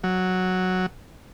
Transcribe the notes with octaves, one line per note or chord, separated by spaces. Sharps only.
F#3